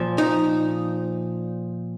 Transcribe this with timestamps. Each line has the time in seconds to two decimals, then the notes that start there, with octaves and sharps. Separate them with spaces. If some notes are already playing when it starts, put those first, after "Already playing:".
Already playing: A#2 F3
0.18 D#4